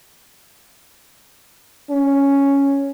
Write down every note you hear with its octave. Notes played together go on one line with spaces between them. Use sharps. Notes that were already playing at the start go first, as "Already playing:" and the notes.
C#4